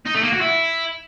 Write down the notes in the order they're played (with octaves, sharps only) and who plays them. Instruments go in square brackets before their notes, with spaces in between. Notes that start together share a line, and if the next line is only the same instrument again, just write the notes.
[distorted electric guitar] D#4
A3
A#3
F#4
E4